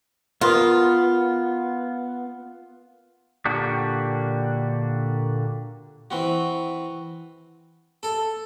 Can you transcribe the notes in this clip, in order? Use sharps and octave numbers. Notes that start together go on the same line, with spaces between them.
B3 F4 A#4 B4 D#6
A#2 D3 A#3 D4 F#4 G4
E3 C4 F#4
A4